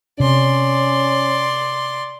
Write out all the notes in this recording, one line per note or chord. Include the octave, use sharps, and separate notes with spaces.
C3 C#4 D5 C6